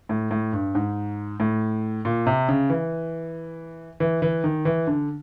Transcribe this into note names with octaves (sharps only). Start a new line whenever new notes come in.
A2
A2
G2
G#2
A2
A#2
C3
C#3
E3
E3
E3
D#3
E3
D3